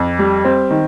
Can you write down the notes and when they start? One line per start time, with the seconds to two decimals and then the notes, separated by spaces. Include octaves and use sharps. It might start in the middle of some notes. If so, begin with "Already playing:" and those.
Already playing: F2
0.19 G3
0.45 C4
0.70 D#3